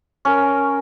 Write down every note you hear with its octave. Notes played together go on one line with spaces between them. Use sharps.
C#4 A#4